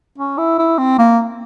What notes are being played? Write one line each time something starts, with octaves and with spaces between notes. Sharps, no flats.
C#4
E4
E4
C4
A#3